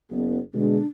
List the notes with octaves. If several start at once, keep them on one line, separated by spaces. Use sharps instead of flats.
F#1 B3
B2 D3 G#3 D4